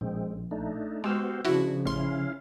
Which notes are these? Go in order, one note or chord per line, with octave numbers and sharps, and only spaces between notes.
A#1 G#3 C4
A3 D4 D#4
G#3 B3 F#4 G4 C5 E6 F6
C#3 F3 D4 E4 F#4
A1 C#4 E4 F5 C6